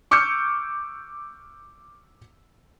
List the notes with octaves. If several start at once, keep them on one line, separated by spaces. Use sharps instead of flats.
C#6 D6 E6 F6 G6 C#7